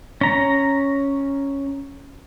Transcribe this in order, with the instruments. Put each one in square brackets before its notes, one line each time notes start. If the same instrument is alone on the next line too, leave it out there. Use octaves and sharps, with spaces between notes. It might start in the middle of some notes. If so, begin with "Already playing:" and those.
[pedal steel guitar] C#4 A#5